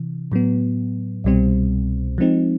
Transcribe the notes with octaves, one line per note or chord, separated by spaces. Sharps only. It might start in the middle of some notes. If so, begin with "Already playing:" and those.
Already playing: C3 E3
A2 F#3 B3
C2 B2 G3 C4
F3 G#3 C4 D#4